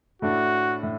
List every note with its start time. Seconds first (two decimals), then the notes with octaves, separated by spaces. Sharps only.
0.22 A2 A3 D4 F#4
0.83 A2